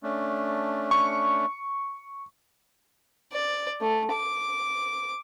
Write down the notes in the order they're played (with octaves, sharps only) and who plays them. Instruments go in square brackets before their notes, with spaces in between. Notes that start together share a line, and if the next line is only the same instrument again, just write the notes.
[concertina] A3 C#4 D4
[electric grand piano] C#6
[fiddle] D5
A3
D6